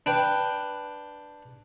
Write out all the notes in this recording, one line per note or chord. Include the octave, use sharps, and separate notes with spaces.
D4 B4 G5